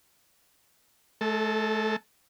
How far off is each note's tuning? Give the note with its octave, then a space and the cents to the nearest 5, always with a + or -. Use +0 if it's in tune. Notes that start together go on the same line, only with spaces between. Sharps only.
A3 -40 A4 +15